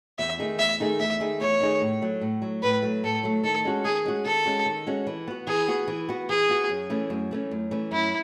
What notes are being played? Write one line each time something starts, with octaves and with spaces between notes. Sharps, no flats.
E2 E5
D#3 A3 D#4 G#4
E2 E5
D#3 A3 D#4 G#4
E2 E5
D#3 A3 D#4 G#4
E2 C#5
D#3 A3 D#4 G#4
A2
F#3 A3
A2
F#3 A3
A2 B4
F#3 A3
A2 A4
F#3 A3
D#3 A4
G#3 C#4 F#4
D#3 G#4
G#3 C#4 F#4
D#3 A4
G#3 C#4 F#4
D#3
G#3 C#4 F#4
E3
B3 F#4
E3 G#4
B3 F#4
E3
B3 F#4
E3 G#4
B3 F#4
F#2
E3 A3 C#4
F#2
E3 A3 C#4
F#2
E3 A3 C#4
F#2 E4